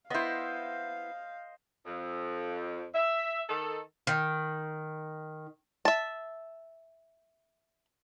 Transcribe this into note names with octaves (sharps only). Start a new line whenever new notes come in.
B3 E4 C5 D#5 F5
F2
E5
D#3 A4
D#3
E5 A5